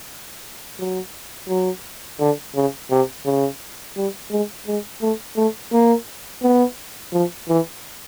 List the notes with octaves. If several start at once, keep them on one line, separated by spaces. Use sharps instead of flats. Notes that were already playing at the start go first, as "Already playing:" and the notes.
F#3
F#3
D3
C#3
C3
C#3
G3
G#3
G#3
A3
A3
A#3
B3
F3
E3